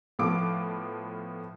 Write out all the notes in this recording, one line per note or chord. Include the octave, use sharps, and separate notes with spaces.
A2 F3 B3 F4 D6 D7